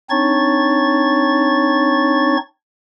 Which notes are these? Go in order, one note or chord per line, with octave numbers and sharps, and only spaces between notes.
C4 D4 D#4 C#5 C#6 A6